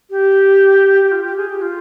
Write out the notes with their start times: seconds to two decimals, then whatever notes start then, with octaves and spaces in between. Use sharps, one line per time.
0.10 G4
1.04 G4
1.12 F4
1.24 G4
1.37 G#4
1.49 G4
1.62 F4